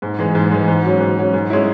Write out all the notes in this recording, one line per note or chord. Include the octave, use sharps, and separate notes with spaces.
G#2
E3 G#3
G#2
E3 G#3
G#2
F#3 C#4
G#2
F#3 C#4
G#2
G#3 C#4 E4